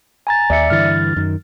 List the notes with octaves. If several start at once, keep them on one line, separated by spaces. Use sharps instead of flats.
G#5 A#5 A6
D#2 D5 E5 C#7
G2 D3 E3 F6 A6
F#2 D#3